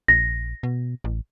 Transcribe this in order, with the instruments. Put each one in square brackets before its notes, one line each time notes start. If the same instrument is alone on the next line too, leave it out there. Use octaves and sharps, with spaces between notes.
[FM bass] A#1 [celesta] A#6
[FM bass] B2
A1